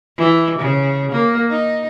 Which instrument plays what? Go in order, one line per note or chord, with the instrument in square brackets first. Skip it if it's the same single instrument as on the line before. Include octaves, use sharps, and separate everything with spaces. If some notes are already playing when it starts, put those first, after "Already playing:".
[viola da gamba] E3
C#3
A#3
D#4